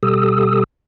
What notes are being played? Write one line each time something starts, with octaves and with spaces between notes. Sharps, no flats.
B2 G3 G4 A4 D#6 E6